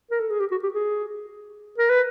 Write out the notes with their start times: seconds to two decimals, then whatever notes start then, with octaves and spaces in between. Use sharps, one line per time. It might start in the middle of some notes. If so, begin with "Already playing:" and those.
0.11 A#4
0.20 A4
0.30 G#4
0.40 G4
0.51 F#4
0.63 G4
0.74 G#4
1.78 A#4
1.90 B4